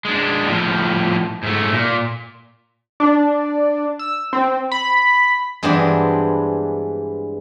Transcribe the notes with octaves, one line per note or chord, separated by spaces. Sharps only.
G#3 D4
A2 F3
G#2 A3
A#2
D4
E6
C4
B5
G2 E3 G#3 B3 C4 D4